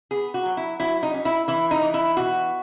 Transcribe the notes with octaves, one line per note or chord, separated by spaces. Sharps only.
B3 G#4
F#4
F#3
E4
F#3 E4
D#4
C#4
E4
E3 E4
D#4
E3
E4
B2 F#4